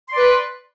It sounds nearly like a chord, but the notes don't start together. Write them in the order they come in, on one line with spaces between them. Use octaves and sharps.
C6 D5 B4